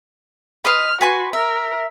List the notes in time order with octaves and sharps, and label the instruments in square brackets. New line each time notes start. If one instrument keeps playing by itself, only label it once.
[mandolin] B4 D#5 C6 [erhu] F6
[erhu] F#4 [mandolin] B4 G#5 C6
[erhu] A#4 [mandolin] E5